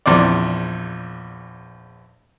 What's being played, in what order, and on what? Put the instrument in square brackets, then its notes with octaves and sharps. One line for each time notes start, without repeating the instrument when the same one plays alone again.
[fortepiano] A#1 E2 C4 D5